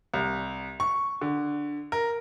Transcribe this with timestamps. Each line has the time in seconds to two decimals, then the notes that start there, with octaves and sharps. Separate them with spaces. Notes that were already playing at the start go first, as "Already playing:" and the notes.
0.14 C2
0.80 C#6
1.21 D3
1.92 A#4